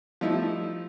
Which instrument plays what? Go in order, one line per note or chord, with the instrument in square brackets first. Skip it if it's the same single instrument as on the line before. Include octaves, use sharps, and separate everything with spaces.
[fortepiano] F3 G3 A3 D#4 E4